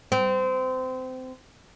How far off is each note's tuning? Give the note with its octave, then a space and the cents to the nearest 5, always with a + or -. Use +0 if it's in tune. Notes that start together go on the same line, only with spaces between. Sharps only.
C4 -25